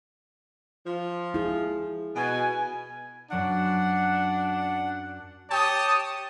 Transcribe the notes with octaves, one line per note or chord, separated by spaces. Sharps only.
F3
E4 G#4
B2 G#5
F#2 F#3 D4 F#5 D7
G4 C#5 G5 A5 D#6